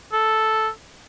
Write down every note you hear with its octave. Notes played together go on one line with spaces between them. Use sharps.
A4